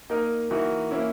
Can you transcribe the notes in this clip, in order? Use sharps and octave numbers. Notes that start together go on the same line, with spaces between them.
A#3 D#4 A#4 D#5
E3 A#3 D#4 F#4 A#4
A#3 C#4 E4